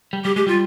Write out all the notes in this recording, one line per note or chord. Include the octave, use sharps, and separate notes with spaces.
G3
G3 G4
G#3 G4
G3 F4